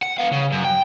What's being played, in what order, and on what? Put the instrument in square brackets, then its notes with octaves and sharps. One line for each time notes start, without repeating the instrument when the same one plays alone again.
[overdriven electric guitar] F#5
B3 F5
C#3
F#2
G5